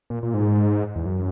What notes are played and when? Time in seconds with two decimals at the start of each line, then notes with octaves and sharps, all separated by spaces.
0.10 A#2
0.23 A#2
0.34 G#2
0.96 E2
1.06 F#2